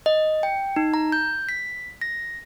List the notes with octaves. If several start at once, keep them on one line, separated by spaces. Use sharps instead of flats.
D#5
G5
D#4
A#5
G6
B6
A#6